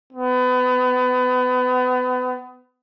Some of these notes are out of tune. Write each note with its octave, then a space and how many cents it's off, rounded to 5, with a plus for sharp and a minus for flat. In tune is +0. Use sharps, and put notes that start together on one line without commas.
B3 +30